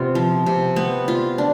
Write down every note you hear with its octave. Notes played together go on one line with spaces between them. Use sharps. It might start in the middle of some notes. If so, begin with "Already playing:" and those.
Already playing: C3 B3 F4
F3
C3
B3
F4
D4